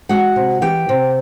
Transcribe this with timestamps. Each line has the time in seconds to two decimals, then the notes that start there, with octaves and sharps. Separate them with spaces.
0.09 G#3 F#4 F#5
0.36 C3
0.62 E3 G4 G5
0.89 C3